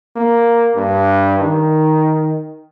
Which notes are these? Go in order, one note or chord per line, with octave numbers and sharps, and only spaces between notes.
A#3
G2
D#3